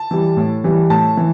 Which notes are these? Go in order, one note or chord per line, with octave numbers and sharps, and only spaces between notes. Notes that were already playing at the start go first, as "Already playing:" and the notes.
Already playing: A5
E3 G3
A2
E3 G3
A2 A5
E3